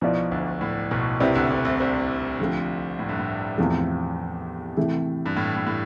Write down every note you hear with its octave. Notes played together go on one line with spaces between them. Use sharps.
B1 B2 F3 B3 E4 B4 D5
D2 D3
A2
B1 B2
C2 C3 G3 C4 E4 B4 D5
D2 D3
D2 D3
C2 C3
C2 C3
D3 F3 A3 C4
A2
G2
A2
E2 C3 F3 A3
C3 E3 A3 E4
G2
A2
A2
A2